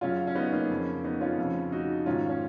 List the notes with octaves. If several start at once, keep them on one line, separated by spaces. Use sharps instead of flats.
F#2 C#3 C#4 F4
C#4
B3 D#4
A#3 C#4
F2 C#3
B3 D#4
C#4 F4
F2 C#3
D#4 F#4
G#2 D#3 C#4 F4
C#4